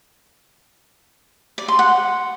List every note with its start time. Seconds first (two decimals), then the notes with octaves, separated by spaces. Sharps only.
1.58 D5
1.68 C6
1.79 F#5